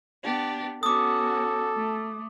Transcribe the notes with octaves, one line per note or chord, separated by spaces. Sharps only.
B3 D4 G4
B3 C#4 F#4 A4 D6 D#6
A3